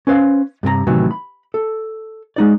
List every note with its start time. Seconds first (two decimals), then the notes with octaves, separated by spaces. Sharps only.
0.07 C#4 B4 C5 F5 C6
0.63 G2 C3 G4 A#5
0.87 A2 C3 D#3 E3 F#3
1.11 B5
1.54 A4
2.36 G#3 D#4 D5